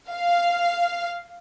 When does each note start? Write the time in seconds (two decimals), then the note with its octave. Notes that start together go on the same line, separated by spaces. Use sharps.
0.11 F5